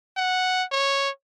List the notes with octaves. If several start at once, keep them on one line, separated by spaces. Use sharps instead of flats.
F#5
C#5